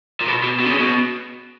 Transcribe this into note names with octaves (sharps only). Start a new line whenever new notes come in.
A#2
B2
B2
B2
D3
C#3
B2